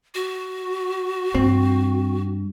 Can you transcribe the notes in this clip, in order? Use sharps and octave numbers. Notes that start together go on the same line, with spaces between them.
F#4
G2 C4